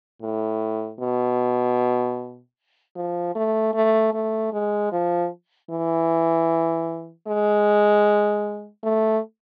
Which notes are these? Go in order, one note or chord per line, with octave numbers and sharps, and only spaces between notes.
A2
B2
F3
A3
A3
A3
G#3
F3
E3
G#3
A3